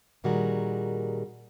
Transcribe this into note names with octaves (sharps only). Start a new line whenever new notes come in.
A#2 D#3 G3 F#4 G#4 A#4